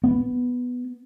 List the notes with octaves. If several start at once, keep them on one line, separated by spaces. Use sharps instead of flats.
B3